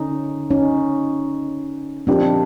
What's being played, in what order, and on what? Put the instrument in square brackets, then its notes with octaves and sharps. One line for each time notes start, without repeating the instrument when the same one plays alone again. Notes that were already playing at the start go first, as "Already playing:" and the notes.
Already playing: [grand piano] D3 [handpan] C#4 D#4
[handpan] C#4 D#4
[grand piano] A#2 F3 A#3 D#4 G4 [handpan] C4 D4